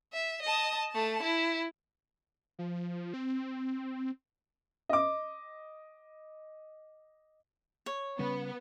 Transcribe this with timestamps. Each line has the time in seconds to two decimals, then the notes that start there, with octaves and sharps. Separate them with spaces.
0.13 E5
0.42 D#5 A5
0.92 A3 A5
1.23 E4
2.59 F3
3.14 C4
4.89 D#5 D6
7.86 C#5
8.19 C#3 G3 B3 C#4